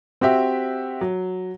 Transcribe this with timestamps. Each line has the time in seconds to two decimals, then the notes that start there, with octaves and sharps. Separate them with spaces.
0.21 C4 F#4 G4 E5
1.01 F#3